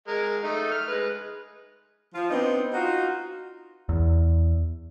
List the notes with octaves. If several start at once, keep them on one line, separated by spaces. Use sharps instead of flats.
G#3 A#4
A3 D#4
F6
G#3 B4
F3 F4
B3 C4 D4 D#4
D#4 F4 F#4
E2